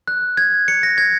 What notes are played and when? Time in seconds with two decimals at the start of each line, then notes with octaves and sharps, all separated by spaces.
0.08 F#6
0.37 G#6
0.68 C#7
0.83 A#6
0.98 G#6